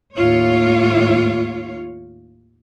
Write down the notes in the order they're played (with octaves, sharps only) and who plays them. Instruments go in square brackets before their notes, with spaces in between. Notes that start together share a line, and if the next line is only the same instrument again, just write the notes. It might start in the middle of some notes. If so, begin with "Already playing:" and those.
[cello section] D#2 A2 F4 C#5